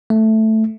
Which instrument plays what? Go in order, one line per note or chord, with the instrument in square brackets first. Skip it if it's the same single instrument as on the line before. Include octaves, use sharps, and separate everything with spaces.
[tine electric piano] A3